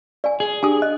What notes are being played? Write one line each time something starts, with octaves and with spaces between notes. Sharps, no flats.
D5 G#5
G#4
D4 G4 G#5 D#6
D#5 F#6